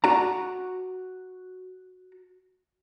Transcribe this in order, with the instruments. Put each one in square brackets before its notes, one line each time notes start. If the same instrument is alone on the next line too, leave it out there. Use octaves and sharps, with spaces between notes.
[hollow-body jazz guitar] F#4 D5 A#5